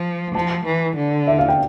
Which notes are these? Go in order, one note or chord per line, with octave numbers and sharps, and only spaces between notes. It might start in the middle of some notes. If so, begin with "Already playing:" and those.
Already playing: F3
F3 A5
E3
D3
E5
F5
G5